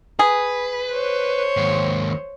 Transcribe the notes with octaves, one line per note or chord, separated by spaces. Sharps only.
G#4 B4
C5 C#5
D#2 G#2